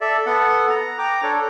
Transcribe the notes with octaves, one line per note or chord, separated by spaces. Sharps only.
A4 D5 E5
B3 A4 F#5
A#5
G5 A#5 D6
D4 A4 C#5